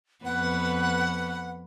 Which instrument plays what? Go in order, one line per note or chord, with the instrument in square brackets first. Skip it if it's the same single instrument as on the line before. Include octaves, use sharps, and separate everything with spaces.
[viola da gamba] F2 B3 B4 [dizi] F#5